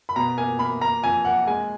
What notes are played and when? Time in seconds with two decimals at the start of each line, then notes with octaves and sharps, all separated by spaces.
0.09 B5
0.16 B2 A#5
0.38 A#3 G#5
0.59 A#3 B5
0.81 A#3 A#5
1.03 F2 G#5
1.25 A#3 F#5
1.47 G#3 G#5